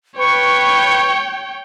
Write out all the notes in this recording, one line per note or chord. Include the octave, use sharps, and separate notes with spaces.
B4 C#5 G5 C#6